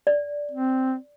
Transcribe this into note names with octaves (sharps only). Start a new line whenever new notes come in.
D5
C4